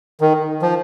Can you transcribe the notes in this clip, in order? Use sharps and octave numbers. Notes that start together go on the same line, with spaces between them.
D#3
F3